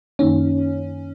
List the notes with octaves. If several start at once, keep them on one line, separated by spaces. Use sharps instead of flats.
F#2 D#3 A#3 C#4 D#4